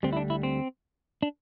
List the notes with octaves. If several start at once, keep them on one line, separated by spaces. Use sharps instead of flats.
D2 D3 G3 C4
E4
D4
E4
C4
D4